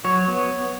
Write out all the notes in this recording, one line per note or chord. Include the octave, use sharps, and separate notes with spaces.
F#3 C#5
B3